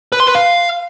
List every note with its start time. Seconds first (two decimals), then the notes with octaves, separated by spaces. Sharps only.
0.12 B4
0.20 C6
0.27 B4
0.35 F5